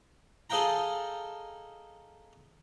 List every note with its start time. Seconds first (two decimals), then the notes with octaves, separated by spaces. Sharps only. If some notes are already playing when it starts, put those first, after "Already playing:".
0.50 G#4 A4 D#5 F5 G5 A#5